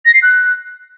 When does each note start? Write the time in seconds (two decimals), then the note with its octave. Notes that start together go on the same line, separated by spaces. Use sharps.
0.06 A#6
0.14 C7
0.22 F#6